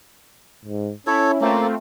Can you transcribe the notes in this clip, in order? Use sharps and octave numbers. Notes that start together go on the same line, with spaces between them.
G#2
C#4 E4 A4 C#5
A3 A#3 C4 F4